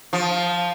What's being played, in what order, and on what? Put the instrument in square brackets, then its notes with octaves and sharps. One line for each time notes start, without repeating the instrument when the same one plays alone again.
[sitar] F3